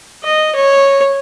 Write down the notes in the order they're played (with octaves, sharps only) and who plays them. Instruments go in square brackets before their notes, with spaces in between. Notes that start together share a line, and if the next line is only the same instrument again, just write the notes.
[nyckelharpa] D#5
C#5